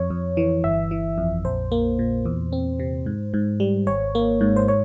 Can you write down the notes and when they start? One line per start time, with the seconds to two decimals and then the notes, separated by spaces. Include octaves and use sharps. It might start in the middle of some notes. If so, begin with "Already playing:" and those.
Already playing: F2 C#5
0.10 F2
0.37 E3
0.63 G1 E5
0.91 E3
1.18 F2
1.45 A#1 C5
1.72 A#3
1.99 A#2
2.25 E2
2.53 C4
2.80 C3
3.06 G#2
3.34 G#2
3.60 G3
3.87 G#1 C#5
4.15 A#3
4.41 G#2
4.56 C5
4.68 C#5